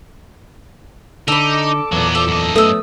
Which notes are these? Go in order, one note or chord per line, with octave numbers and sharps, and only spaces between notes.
D3 D#4 A4 B5 D6
E2 A#2 F#3 B3
F3 A4
F#2 D#5
A3 B3 A4 D#6 E6